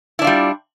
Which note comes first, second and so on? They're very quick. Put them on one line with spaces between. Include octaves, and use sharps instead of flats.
E4 D4 F4 G3